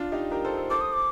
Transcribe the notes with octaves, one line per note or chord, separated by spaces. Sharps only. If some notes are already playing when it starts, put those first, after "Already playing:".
Already playing: D4 F4
D#4 G4
G4 A#4
A4 C5
A4 C5
A4 C5 D6
D#6
D6